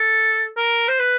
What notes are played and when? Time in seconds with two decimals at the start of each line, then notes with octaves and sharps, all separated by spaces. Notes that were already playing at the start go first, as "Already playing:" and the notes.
Already playing: A4
0.57 A#4
0.88 C5
1.00 B4